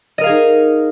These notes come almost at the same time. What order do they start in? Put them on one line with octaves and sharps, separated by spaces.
D#5 A#4 F5 G#4 D#4